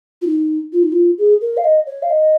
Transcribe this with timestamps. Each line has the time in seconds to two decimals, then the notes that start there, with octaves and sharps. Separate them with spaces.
0.22 F4
0.27 D#4
0.73 F4
0.83 D#4
0.92 F4
1.18 G#4
1.41 A#4
1.57 F5
1.64 D#5
1.87 C#5
2.03 F5
2.10 D#5